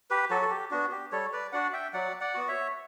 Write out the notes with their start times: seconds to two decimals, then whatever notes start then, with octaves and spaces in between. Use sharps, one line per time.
0.10 G4 B4
0.30 F#3 F#4 A4
0.42 A4
0.51 G4
0.71 B3 D4 F#4
0.92 G4
1.12 G3 A4 C#5
1.33 B4 D5
1.52 D4 F#4 D5 F#5
1.73 E5 G5
1.93 F#3 D5 F#5
2.20 D5 F#5
2.34 B3 F#4
2.48 C#5 E5